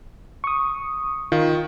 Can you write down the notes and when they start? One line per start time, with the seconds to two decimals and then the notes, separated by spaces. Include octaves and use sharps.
0.44 C#6 D#6
1.32 D#3 F4